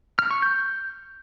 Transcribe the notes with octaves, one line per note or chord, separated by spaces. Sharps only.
F6
C#6
G6